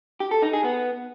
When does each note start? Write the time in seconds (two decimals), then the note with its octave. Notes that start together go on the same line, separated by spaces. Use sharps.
0.20 G4
0.31 A4
0.42 D#4
0.53 G#4
0.64 B3